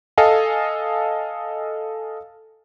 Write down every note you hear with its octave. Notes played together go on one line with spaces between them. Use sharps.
A4 D#5 F5 G#5